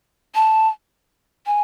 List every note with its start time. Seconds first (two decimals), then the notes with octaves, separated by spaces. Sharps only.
0.35 A5
1.47 G#5